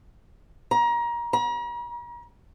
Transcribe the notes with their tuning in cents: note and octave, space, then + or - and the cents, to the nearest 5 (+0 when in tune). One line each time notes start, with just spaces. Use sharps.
A#5 +25
A#5 +40